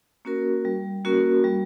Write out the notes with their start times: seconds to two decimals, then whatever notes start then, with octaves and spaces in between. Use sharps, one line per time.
0.25 A#3 C#4 F#4 A#4
0.65 G3
1.05 A#3 C#4 F#4 A#4
1.44 G3